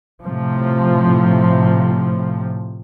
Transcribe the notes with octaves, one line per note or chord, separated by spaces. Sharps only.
A2 C3 F3